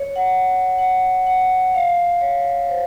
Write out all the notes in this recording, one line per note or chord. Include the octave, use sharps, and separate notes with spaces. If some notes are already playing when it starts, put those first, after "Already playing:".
Already playing: C#5
F#5
F#5
F#5
F5
C#5
C5